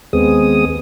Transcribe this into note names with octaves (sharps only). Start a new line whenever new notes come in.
D#2 G#3 B3 C4 G#4 D#6